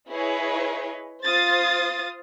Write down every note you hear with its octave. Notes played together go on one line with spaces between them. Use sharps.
E4 G#4 B4 C#5 D#5
F4 C5 F5 D#6 A6